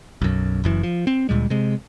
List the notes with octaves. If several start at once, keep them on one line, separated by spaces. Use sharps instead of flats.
B1 F#2
F#1 F#2 E3
F3
C4
D2 A#2 G3 G#3
C3 G#3